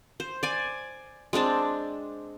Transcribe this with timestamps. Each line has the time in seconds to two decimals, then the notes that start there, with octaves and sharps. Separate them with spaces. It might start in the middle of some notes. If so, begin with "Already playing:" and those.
0.20 C5
0.43 D5 G#5
1.33 G#3 C4 D4 A5